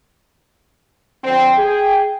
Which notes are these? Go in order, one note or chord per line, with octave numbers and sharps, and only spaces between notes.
D3 F3 C4 G5
G#4